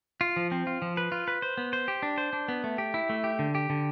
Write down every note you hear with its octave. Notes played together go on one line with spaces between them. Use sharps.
F4
F3
C4
F4
F3
B4
F4
B4
C5
B3
C5
G4
D4
C5
D4
B3
A3
G4
E4
A3
G4
D3
G4
D3